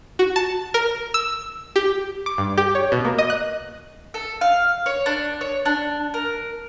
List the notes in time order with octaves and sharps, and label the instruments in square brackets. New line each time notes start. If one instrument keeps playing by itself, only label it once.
[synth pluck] F#4
A5
A#4
E6
G4
D6
G2
G4
C#5
B2
A#3
D#5
F#6
[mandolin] A4
F5
C#5
D4
C#5
D4
A#4